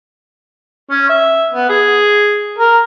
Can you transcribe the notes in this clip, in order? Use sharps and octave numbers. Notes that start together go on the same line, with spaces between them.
C#4
E5
B3
G#4
A#4